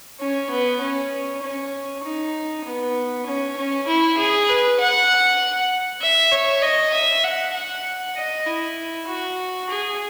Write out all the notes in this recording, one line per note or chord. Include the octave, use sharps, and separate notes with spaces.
C#4
B3
C#4
C#4
D#4
B3
C#4
C#4
E4
G#4
B4
F#5
E5
C#5
D#5
E5
F#5
F#5
D#5
E4
F#4
G#4